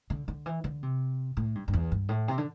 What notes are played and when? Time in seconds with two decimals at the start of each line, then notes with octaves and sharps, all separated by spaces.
0.10 D3
0.28 D3
0.46 E3
0.64 D3
0.83 C3
1.37 A2
1.55 G2
1.68 G2
1.74 E2
1.92 G2
2.09 A2
2.28 C3
2.38 D3